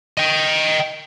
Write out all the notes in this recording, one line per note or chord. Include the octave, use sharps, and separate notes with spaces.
D#5 G5